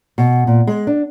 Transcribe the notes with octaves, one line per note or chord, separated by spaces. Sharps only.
B2
A#2
G#3
D4